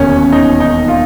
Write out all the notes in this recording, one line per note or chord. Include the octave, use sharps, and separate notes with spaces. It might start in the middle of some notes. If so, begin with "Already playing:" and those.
Already playing: E1 D#2 D#3 C#4
D#4
D#4
F4